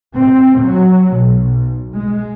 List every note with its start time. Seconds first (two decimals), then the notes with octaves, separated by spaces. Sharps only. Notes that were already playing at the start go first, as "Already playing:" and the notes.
0.19 C4
0.64 F#3
1.21 B1
1.95 G#3